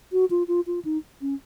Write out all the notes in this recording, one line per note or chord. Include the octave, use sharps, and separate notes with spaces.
F#4
F4
F4
F4
D#4
C#4